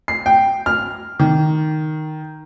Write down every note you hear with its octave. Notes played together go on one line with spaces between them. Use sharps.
C7
G5
F6
D#3